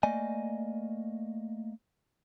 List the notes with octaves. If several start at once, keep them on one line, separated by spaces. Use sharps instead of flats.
A3 A#3 D5 D#5 G#5